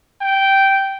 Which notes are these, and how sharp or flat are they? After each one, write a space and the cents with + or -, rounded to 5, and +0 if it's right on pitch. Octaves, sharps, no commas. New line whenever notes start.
G5 -10